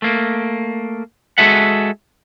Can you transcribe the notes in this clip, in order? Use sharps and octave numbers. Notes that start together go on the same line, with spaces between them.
A3 A#3
G#3 F#4 G#4 A4 E5 F#5